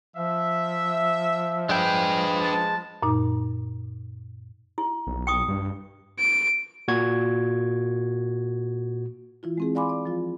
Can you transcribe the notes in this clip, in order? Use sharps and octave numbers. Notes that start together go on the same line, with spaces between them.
F3 E5
G#3 D4 B4 G5
A5
F#2 A#2 D#4
E4
B1
G5 C#6 D#6
G2
D7
A#2 F#4 G#6
E3 E4 F4
G#3 C4 G#4
D5 F5 G#5 B5 C6 D6
D5
F3 F4